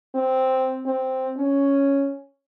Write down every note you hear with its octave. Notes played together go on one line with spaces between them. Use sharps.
C4
C4
C#4